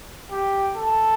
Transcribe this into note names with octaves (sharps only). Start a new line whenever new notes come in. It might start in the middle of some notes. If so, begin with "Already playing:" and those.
G4
A4